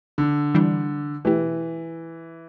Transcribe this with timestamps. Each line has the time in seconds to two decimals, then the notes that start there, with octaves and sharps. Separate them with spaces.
0.18 D3
0.54 E3 G3 D4
1.25 B2 E3 A3 E4 G4